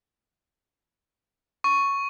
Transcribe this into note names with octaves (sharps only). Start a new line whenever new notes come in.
C#6